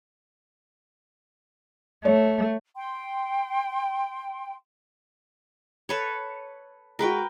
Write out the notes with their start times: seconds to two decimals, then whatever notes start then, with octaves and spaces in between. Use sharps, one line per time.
2.05 A3 C#5
2.77 G5 C6
5.89 A4 B4 C#5
6.99 G#3 F#4 A#4 B4 G5